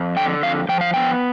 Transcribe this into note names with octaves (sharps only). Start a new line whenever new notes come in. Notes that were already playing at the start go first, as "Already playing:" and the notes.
Already playing: F2
D3 G5
F2 F5
F3 G5
F5
B3 G5